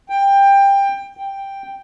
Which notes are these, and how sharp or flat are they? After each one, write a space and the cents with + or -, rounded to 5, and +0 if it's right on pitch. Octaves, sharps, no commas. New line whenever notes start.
G5 +20
G5 +5